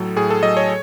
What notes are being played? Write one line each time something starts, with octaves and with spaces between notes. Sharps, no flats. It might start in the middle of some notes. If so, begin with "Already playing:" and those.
Already playing: A2 F#3 A4
A2 G#4
A4
F#3 D#5
C#5